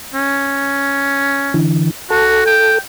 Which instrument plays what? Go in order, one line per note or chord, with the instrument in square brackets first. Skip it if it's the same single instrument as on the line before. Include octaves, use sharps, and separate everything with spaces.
[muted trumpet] C#4
[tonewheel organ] D3 E3
[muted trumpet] F#4 [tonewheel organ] A4
[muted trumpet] G5